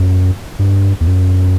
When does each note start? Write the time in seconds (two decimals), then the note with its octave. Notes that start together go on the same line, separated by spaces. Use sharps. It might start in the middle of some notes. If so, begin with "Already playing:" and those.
Already playing: F#2
0.59 G2
1.01 E2
1.07 F#2